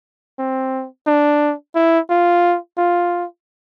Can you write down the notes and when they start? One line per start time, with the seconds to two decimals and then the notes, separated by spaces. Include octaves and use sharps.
0.39 C4
1.07 D4
1.75 E4
2.10 F4
2.78 F4